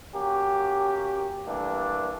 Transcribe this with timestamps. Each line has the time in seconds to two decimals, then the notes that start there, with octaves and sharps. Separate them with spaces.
0.14 A#3 C#4 F#4 G4
1.47 E3 G3 A3 A#3 D4